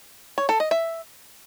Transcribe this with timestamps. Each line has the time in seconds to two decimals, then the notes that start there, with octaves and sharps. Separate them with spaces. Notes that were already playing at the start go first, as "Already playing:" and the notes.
0.38 C#5
0.49 A4
0.60 D#5
0.71 E5